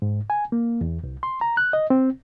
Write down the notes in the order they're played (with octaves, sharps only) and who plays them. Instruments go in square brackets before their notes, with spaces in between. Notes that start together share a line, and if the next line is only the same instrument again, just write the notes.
[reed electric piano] G#2
G#5
A#3
E2
C2
C6
A#5
F#6
D#5
C4